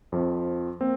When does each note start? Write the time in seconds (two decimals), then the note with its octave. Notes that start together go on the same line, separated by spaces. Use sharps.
0.12 F2 F3 C4
0.80 A#3 C4